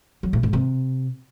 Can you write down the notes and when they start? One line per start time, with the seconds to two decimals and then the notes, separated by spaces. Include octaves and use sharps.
0.23 F#3
0.33 A2
0.43 G#2
0.53 C3